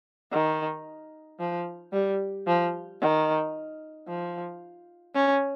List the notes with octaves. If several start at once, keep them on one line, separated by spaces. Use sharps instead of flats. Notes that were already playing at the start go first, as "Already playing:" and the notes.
D#3
F3
G3
F3
D#3
F3
C#4